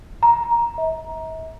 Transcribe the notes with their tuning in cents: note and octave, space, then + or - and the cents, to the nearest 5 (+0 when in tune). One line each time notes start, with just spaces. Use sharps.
A#5 +10
E5 -45